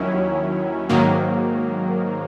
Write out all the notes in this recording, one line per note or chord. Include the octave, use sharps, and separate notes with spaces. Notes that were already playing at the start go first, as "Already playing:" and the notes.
Already playing: D#2 D#3 F#3 C#4 E4
G#2 D#3 F#3 A#3